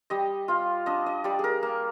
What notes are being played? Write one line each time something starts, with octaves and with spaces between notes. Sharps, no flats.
G3 D#5
F4 F5
D4 D#5
D#5
G3 D5
G#4 A#4
A#3